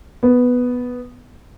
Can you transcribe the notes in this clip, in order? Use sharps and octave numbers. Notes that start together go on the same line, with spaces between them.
B3